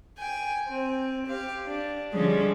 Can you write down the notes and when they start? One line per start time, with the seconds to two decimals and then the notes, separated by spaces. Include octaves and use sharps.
0.19 G5 G#5
0.68 C4
1.27 G4 F5
1.67 D4
2.13 D3 F3 G3 G#3 C#4 D4